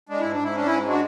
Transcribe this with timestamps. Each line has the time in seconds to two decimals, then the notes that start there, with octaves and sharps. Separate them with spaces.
0.09 G#3 D4
0.20 G#2 E4
0.32 D4
0.40 G#2 E4
0.55 C#4 D4
0.66 G#2 E4
0.84 G#3 D4 F#4